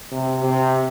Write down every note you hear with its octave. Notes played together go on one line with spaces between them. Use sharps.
C3
C3